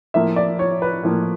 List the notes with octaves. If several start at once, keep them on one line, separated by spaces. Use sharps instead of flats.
A2 F3 A#3 E5
D5
C#5
B4
A2 F3 A#3